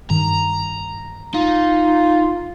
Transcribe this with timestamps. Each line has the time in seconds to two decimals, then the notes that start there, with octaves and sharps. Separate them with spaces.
0.10 G2 D#3 A#5
1.34 D#4 F4